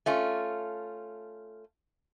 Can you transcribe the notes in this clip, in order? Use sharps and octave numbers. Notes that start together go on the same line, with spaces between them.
A3 C#4 F4